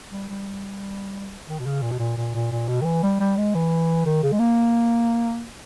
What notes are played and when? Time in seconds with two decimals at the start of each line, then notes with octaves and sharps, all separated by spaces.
0.11 G3
0.29 G3
1.49 D#3
1.59 B2
1.66 C#3
1.82 A#2
1.91 B2
1.99 A#2
2.17 A#2
2.34 A#2
2.51 A#2
2.68 B2
2.81 D#3
2.85 E3
3.03 G3
3.20 G3
3.37 G#3
3.55 E3
4.06 D#3
4.23 C#3
4.32 G#3
4.39 A#3